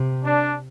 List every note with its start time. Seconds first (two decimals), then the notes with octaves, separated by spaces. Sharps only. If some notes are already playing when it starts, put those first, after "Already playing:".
Already playing: C3
0.24 D4